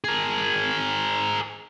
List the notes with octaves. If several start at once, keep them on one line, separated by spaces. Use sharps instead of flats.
G#4 A#4